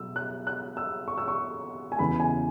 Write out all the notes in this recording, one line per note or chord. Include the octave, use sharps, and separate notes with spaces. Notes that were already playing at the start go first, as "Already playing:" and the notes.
Already playing: B2 F#3 E6
F#6
F#6
E6
C#6
E6
C#6
G#5
E2 C#3 E3 B5
G#5